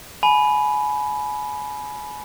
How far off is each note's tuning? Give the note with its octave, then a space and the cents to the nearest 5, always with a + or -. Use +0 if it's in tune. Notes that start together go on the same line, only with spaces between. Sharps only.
G#5 +25 B5 +0